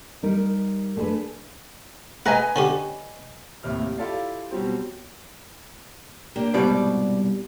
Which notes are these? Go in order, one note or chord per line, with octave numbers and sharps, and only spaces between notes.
G3 D#4 A#4
A3 D4 G#4 A4 B4
B4 D#5 F#5 G#5 A#5
D3 C#4 G4
D#2 A2 C3 F6
E4 F4 G4 A4 D5 F5
B2 F#3 G3 C4
A#3 D4 G4
C2 G#2 B2 G3 D5